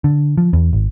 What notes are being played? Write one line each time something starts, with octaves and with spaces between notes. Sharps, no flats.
D3
F3
E2
G#1